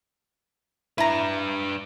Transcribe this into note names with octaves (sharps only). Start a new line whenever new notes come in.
D4 E4 B4 A#5